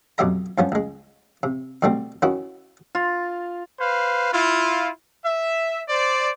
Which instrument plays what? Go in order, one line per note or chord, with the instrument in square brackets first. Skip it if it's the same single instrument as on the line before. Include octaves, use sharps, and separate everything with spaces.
[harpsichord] F2 B2 F#3 G4 E5 A#5
G2 F3 B3 C#4
C#2 G#3
C3
B2 D3 G3 A3 C4
D#3 C#4 E4 F#4
[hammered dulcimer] F4
[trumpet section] B4 C5 F5
E4 F4
E5
C5 D5